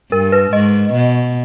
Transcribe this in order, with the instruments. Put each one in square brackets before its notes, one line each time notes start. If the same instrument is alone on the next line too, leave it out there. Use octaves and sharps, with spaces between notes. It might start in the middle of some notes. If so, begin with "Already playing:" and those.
[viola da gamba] G2 [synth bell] A#4
[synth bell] B4
[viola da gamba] G#2 [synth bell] D#5
[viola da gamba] B2